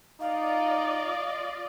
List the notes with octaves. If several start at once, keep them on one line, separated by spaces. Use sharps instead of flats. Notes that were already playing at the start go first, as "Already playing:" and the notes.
D#4 F4 D5 D#5 F5